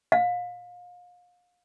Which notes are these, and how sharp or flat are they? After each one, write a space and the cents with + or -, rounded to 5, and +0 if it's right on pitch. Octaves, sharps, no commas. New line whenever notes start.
F5 +35